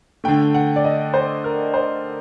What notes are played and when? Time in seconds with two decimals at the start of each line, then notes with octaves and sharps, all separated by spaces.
0.24 D3 A3 G5
0.54 F#5
0.76 D5
0.84 D#5
1.14 C5
1.44 A#4
1.74 C5